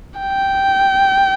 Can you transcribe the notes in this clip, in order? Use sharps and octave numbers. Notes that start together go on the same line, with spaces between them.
G5